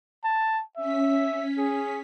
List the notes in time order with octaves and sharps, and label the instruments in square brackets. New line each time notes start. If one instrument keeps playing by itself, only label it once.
[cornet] A5
[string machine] C#4 B6 [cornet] E5
[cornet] G#4